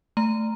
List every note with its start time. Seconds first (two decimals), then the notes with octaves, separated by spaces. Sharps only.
0.17 A3 A#5